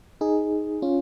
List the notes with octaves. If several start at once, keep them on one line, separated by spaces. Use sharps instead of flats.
D#4 G#4
C#4 F4